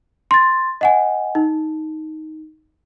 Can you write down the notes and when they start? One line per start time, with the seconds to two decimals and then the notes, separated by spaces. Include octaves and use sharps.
0.31 C6 A6
0.81 D#5 F#5 G#5
1.35 D#4